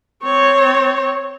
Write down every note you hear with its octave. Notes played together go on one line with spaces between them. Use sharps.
C4 C#5